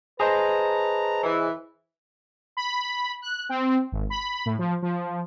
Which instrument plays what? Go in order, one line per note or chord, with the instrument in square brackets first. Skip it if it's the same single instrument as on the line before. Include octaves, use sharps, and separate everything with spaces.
[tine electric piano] G#4 C5 D#5 [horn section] B4 A5 A#5
[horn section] E3
[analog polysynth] B5
F#6
C4
G#1
B5
A2
F3
F3